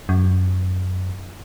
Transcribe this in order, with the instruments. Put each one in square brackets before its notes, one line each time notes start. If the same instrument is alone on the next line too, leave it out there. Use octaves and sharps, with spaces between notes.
[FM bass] F#2